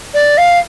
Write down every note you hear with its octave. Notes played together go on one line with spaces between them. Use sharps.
D5
F5